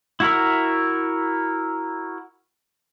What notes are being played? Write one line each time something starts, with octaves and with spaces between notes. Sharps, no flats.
E4 F#4 A#4 E5